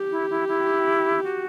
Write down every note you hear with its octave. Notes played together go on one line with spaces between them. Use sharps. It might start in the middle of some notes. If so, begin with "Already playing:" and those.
Already playing: G4
E4
E4
E4
F#4